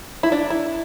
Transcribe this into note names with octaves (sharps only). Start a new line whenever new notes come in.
E4
D4
E4